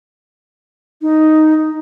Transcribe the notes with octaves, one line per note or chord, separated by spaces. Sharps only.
D#4